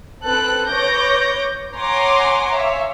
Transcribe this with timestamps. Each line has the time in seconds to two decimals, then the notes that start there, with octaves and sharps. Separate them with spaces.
0.23 C4 A4 B4 F#6
0.68 B4 C#5 D6 G6 A#6
1.77 C#5 F#5 G#5 A#5 C6 D6
2.54 C#5 E5 F5